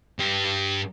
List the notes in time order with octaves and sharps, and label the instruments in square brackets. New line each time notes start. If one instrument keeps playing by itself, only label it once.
[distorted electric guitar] G2 G4